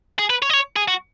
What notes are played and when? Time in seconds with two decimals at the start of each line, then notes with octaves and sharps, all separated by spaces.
0.19 G#4
0.30 B4
0.42 C#5
0.50 D#5
0.53 C#5
0.76 G#4
0.88 F#4